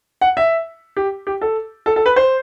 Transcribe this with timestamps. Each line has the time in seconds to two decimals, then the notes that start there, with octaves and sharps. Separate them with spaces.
0.21 F#5
0.37 E5
0.97 G4
1.27 G4
1.41 A4
1.86 A4
1.96 A4
2.06 B4
2.16 C5